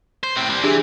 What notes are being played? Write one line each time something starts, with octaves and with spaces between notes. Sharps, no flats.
C5
A2 C4
G3 C4
E3 D4 G4 G#4